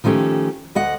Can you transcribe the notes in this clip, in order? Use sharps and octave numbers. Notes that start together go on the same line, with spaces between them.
D#3 F3 A3 C#4 G4
D2 D#5 F#5